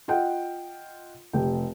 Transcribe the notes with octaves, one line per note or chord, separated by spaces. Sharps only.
F4 D#5 F#5 G5
F1 G4 G5